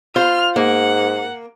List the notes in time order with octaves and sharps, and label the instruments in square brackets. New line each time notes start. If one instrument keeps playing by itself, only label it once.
[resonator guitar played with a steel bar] F4 C5 [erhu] F6
[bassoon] G#2 [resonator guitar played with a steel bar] A#3 [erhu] F#5